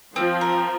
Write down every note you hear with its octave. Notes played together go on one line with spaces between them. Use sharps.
F3 C4
A#4